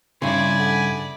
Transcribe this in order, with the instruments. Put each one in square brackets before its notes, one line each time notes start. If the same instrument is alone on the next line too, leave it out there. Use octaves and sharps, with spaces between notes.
[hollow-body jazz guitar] G2 C#3 [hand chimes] D#4 C6 [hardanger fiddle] E4 D5 [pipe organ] G#5
[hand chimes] A4 F#5 B6